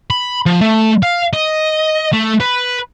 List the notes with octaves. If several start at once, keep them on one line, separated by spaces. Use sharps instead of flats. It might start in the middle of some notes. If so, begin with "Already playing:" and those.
B5
F3
A3
F5
D#5
A3
B4